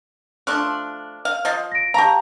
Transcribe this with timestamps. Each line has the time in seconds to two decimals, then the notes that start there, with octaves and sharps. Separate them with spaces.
0.47 F3 A3 D4 C#6 F6 F#6
1.25 F5
1.45 F3 D#5 F5
1.72 A#6 D7
1.94 G4 F5 A5 A#5 C#6